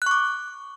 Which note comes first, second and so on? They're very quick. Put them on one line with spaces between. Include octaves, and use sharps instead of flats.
F#6 C#6 D6